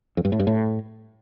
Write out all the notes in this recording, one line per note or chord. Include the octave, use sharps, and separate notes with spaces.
F2
G2
A2
G2
A2